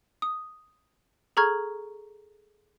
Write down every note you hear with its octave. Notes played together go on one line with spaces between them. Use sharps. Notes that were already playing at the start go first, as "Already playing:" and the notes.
D#6
G#4 A4 A#5 C#6 F6 G#6